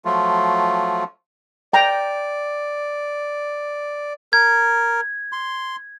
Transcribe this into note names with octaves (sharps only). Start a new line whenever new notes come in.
F3 F#3 A3 F4
D5 G5 A#5
A#4 G#6
C6